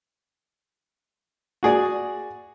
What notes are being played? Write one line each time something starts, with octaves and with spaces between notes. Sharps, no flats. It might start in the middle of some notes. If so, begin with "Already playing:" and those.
F#4 G#4 D5